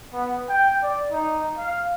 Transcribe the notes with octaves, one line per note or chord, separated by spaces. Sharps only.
B3
G5
D5
D#4
F5